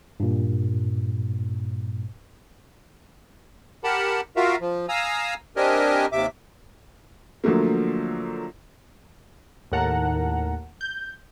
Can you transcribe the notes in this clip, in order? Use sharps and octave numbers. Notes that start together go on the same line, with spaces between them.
G2 A#2
G4 A#4 F#5 A5 B5
F4 F#4 A#4 E5 F5
F3
F5 G#5 A#5 D#6 E6
C4 D4 G4 A#4 D#5 G#5
D#2 C3 E5 D6
D3 F3 F#3 A3 A#3
D#2 A2 A#4 F#5 A5 A#5
G6